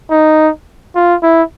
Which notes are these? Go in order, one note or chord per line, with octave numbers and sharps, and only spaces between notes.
D#4
F4
E4